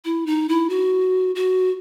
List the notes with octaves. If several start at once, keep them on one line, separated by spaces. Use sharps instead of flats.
E4
D#4
E4
F#4
F#4